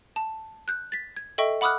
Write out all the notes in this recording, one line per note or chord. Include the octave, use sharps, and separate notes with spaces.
A5
F#6 G6
A6 B6
G#6
A4 D#5 E5 G5 C#6
F#5 B5 D6 D#6 F6 F#6